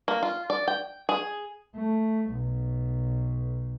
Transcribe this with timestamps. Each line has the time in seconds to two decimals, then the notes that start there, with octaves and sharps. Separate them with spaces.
0.08 A#3
0.23 F4
0.50 D5
0.68 G5
1.09 G#4
1.76 A3
2.32 B1